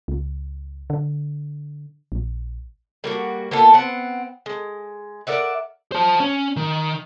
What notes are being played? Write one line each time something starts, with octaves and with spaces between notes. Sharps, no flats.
C#2
D3
A#1
G3 A#3 F#4
A#3 B3 F4 A4
B3 C4 F#5
G#3
A#4 D5 E5 F#5
C5 A5
C#4
D#3